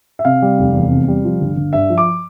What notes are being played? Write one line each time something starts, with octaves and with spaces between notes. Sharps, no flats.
E5
C3 F5
G3
F1
E2
C3
G3
F3
G1
G1
G2 E5
F3
D6